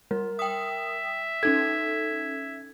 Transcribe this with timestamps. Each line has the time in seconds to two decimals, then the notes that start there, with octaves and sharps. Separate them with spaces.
0.11 G3 A#4
0.39 E5 G5 D#6
1.43 C#4 D#4 A4 G#6